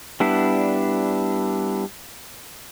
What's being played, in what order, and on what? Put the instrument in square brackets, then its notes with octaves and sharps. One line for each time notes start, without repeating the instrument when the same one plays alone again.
[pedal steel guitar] G3 B3 D4 E4